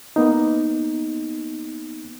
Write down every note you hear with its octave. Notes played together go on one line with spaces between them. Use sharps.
A#3 B3 D#4